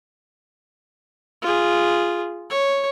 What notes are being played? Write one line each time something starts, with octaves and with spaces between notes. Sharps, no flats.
F4 G#4
C#5